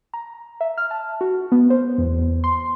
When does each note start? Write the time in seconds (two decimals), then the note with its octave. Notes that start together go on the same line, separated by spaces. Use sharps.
0.14 A#5
0.61 E5
0.78 F6
0.91 A5
1.21 F#4
1.52 B3
1.70 C5
1.98 E2
2.44 C6